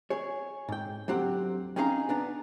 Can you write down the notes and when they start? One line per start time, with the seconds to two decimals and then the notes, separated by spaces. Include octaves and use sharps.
0.10 G#4 C#5
0.69 G#2 G5
1.08 D2 F#3 C4 G4 F#5
1.76 C4 C#4 D#4 G#4 F5 A#5
2.09 B3 D4 A#5